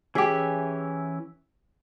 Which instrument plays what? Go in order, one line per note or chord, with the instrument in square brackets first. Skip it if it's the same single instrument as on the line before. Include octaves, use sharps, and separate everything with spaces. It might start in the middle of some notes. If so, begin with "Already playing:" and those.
[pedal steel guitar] E3 C#4 E5 [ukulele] G4 G#4